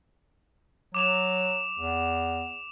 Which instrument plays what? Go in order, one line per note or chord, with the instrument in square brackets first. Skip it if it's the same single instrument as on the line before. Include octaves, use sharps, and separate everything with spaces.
[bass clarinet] F#3 [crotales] D6 E7 F7
[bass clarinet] E2